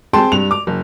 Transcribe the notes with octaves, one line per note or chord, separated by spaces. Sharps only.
C4 G#4 G5 A5 C6
G2 F7
D6
F#1